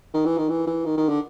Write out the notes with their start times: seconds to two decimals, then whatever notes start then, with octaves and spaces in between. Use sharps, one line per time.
0.14 D#3
0.25 E3
0.38 D#3
0.49 E3
0.67 E3
0.85 D#3
0.97 D#3
1.09 D3